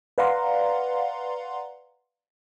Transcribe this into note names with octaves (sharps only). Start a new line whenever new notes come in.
B4 D5 F5 F#5 A#5 C6